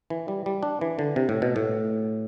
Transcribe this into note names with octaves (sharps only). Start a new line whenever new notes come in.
E3
G3
G3
D4
E3
D3
C3
A2
B2
A2